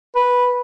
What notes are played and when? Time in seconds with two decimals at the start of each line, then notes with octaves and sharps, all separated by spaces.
0.16 B4